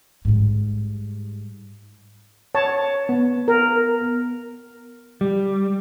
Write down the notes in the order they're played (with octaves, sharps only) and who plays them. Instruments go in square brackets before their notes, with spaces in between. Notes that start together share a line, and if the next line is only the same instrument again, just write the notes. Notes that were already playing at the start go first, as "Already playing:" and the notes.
[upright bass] G#2 G3
[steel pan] C#5 A5
[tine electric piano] B3
[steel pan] A#4
[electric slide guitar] G3